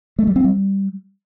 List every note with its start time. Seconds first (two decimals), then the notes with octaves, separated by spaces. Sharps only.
0.19 A3
0.27 G3
0.36 C4
0.44 G3